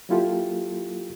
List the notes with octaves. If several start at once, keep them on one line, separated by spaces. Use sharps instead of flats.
F#3 A#3 E4 F4 G4 A4